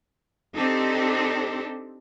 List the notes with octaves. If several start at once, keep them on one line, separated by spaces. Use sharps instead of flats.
C4 D4 D#4 G4 A4